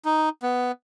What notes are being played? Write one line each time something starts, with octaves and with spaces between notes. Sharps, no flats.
D#4
B3